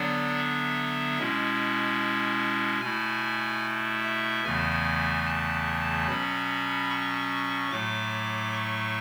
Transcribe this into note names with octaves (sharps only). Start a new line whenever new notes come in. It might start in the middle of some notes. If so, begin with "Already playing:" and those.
Already playing: D3 F#3 B3 D4 D5
E5
B2 G#3 C#4 E4
B2 A3 E4 G#5
E5
E2 C#3 E3 A3 G#5
A5
B2 F#3 C#4 B5
C#6
A2 F#3 A3 D6
C#6